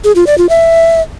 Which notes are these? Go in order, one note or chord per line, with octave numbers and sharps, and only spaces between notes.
G#4
F4
D5
F4
E5